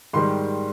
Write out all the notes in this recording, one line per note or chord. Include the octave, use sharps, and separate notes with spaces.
G#2 D#3 G3 C6